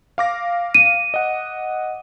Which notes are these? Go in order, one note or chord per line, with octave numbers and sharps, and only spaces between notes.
F5 D6 A#6
D#7
D#5 F#5